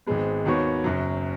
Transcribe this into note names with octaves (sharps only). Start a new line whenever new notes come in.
G#1 G#2 G#3 B3
D#2 D#3 B3 F#4 C#5
F#1 F#2 F#3